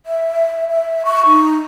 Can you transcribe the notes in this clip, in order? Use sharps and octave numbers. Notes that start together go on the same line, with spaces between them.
E5
E5
C#6
D#4